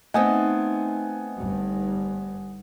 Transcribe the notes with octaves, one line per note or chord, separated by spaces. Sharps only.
A3 B3 C4 D#4 F#5 G#5 D#6
G1 G2